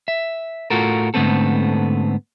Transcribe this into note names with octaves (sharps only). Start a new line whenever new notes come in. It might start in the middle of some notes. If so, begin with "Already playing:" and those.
E5
A2 F4 F#4 A4 A#4
G#2 D3 A3 B3 C4 A4